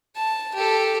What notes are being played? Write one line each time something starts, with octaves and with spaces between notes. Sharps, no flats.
A5
G4 A4